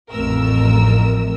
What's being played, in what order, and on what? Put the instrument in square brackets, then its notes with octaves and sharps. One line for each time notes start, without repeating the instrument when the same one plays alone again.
[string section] A1 F2 A3 A#4 E6